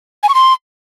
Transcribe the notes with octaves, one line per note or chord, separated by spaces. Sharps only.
G#5
C#6
C6